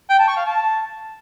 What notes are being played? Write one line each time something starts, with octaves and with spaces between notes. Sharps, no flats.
G5
A5
C#6
F5
A5